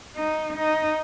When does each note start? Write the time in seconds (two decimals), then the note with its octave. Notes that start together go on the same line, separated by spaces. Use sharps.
0.16 D#4
0.57 D#4